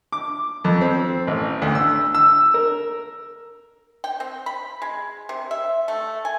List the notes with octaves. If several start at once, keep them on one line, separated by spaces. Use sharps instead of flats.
D6
F2
C4
A1
D2
E6
E6
A#4
G5
C4
B5
G#3
C3
E5
A3
G#5